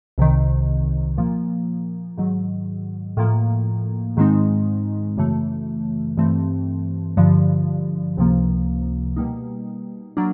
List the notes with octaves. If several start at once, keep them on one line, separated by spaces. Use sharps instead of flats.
C2 C3 D#3
A#2 F3 A#3
G#2 D#3 F#3
A2 F3 A#3
G#2 D#3 G#3 C4 D#4
F#2 C#3 E3 A3
G2 E3 A3 C4
G2 D3 F3
C#2 C3 F3 A#3
B2 G3 A#3 D#4
F#3 A#3 D4